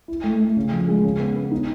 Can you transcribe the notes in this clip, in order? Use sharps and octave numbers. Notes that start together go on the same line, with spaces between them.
E4
A3
A3
C#3
F3
G#3
C#3
B3
B3
D#4